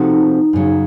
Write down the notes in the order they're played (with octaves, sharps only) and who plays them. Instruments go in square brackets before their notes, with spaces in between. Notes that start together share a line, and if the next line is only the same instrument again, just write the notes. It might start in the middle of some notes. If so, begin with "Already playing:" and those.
Already playing: [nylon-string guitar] C3 F3 C4 F#4 A4 [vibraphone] D#4
[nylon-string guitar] F#2 C#3 F#3